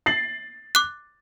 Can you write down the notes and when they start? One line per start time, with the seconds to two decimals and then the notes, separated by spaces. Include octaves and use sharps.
0.06 A6 C7 F#7
0.75 D6 F#6